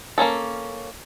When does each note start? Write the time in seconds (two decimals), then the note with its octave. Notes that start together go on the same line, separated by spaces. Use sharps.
0.18 A#3 C4 C#4 A4